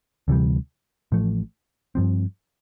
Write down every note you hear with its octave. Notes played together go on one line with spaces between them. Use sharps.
D2 C3 E3 G3
A1 A2 F3 A3
G2 F3 C4